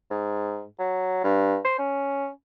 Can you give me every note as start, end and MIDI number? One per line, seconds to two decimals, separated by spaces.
0.11 0.64 44
0.79 1.19 54
1.24 1.58 43
1.65 1.76 72
1.79 2.28 61